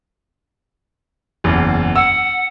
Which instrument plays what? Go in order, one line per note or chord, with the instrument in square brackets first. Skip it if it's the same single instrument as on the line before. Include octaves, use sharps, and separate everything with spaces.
[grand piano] F#1 E2
[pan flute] F#5 [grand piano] E6